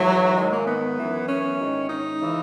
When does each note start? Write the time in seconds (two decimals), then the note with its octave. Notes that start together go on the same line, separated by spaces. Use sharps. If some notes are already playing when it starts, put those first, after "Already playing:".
Already playing: G#2 E3 F#3
0.37 G#2 D#3 G#3
0.52 A#3
0.67 B3
0.98 F#2 E3
1.29 C#4
1.60 G#2 D#3
1.89 D#4
2.21 C#3 E3